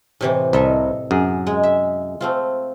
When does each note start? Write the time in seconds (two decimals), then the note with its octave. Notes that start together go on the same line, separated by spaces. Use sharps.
0.21 A2 C3 E3
0.53 C2 A4 D#5 E5
1.11 F#2 G#4
1.47 G#3
1.63 E5
2.21 A3 C4 F4